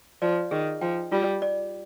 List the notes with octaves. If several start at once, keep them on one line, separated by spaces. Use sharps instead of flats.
F3 D5
D#3 G#4
F3 G5
G3 F4
D5